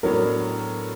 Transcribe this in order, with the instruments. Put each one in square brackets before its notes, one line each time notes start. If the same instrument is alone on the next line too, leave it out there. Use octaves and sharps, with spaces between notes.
[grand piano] A2 F#3 B3 D4 [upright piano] A#4